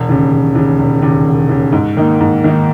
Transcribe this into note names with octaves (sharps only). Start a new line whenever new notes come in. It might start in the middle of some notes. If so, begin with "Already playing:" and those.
Already playing: E1
D#2 C#3
E1
D#2 C#3
E1
D#2 C#3
E1
D#2 C#3
G#2
D#3 A#3 D#4
G#2
D#3 A#3 D#4